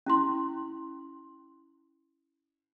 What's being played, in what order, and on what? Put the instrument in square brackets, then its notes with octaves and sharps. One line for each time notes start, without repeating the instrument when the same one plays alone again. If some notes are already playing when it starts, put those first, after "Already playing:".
[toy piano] C#4 E4 C6